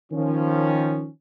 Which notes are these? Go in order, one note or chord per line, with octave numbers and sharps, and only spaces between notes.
D#3 F3 C#4